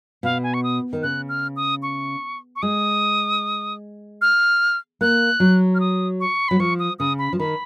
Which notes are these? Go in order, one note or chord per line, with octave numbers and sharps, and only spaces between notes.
B2 F5
G#5
C#6
D#6
D#3
C#3 F#6
F6
D#6
C#6
C#6
G#3 D#6
F6
A#3 F#6
F#3
F6
D#6
C#6
F#3 B5
F3 C#6
D#6
C#3 D#6
B5
F3
D#3 B5